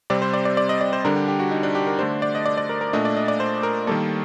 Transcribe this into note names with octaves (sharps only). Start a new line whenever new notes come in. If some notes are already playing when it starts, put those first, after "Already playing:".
C3 G3 C4 D5
C5
D5
D5
D5
D#5
D5
C5
D3 G3 D4 A#4
G4
G4
F#4
D#4
D4
G4
A#4
D3 A3 D4 C5
D5
D#5
D5
D5
A#4
A#4
A#2 A3 D4 D#5
D5
D#5
D5
C5
A#4
D#3 G3 A#3 A4